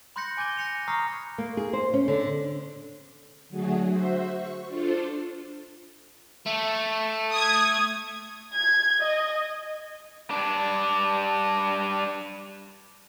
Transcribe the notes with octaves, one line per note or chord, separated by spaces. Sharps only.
B5 C6 F#6 G6 A#6 C#7
G#5 D6 G6 G#6 D#7 G7
F#6 A#6 C#7 F7
A#5 C#6 D#6 F6 A#6 C7
A#3
G#4
C5
C#4
D3
D3 F#3 A3 F#4 G#4
F#4 C5 E5
C#6
D4 F4 A4 C5
A3
D#6 G#6
G#6
D#5
G2 D4